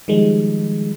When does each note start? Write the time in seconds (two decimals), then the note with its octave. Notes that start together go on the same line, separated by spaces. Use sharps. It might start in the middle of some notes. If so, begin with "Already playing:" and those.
0.08 D#3 F3 G3 G#3